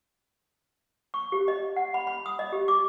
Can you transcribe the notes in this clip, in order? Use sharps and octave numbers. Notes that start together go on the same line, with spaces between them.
C#6
G4
D#5
F#5
B5
B5
D#6
D#5
G4
D6